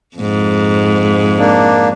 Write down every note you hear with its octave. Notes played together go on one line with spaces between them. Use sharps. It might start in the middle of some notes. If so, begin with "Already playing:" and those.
F2 G#2
A#3 D4